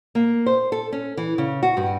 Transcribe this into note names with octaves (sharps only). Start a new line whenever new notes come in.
A#3
C5
A4
C#4
E3
C#3
F#4
G2